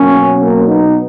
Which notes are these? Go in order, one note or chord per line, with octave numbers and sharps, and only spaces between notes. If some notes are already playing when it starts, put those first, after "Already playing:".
Already playing: B2 F#3 A#3 C#4
A#3 C#4
B3 D#4